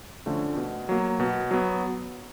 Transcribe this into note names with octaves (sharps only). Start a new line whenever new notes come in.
D3 F3 A3 C#4
B2
F#3 A#3
B2
F#3 B3